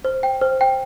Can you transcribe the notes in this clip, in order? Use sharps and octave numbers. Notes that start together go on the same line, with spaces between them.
C5
G5
C5
G5